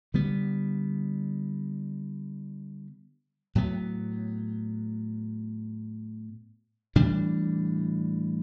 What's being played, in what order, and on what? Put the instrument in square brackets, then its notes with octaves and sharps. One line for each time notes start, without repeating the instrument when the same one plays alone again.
[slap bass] D3 G3 B3
A2 F#3 B3
A2 E3 G3 D4